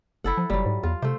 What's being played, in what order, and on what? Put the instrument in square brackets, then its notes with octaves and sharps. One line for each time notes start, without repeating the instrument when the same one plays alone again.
[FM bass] F#1 [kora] E4 A4 F#5
[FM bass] F3
[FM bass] F#1 [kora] F#3 G3
[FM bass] G#2
[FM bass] E2 [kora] F4
[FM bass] C3 [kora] A3 C5